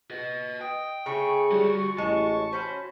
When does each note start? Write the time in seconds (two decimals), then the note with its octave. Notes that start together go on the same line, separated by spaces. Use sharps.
0.11 B4 D#5
0.61 D#5 G5
1.06 C#3 A3 G#4 C#6
1.52 D3 G3 F#4
1.98 A1 G#3 F#4 A5
2.53 C#4 F#4 C5 B5